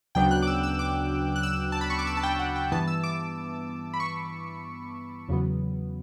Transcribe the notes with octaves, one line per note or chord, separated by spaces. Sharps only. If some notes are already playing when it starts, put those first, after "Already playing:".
D2 C#3 F#3 B3 D4 G5
F#6
D6
E6
E6
D6
F#6
E6
A5
B5
C#6
D6
E6
A5
G5
F#5
G5
G2 E3 B3 A5
E6
D6
B5
C#6
E2 C#3 F#3 B3